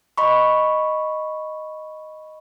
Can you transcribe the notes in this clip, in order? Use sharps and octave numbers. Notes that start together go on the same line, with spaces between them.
D#5 B5 C#6